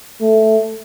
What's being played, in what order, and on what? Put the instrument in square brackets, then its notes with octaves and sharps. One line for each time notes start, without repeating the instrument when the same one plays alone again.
[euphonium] A3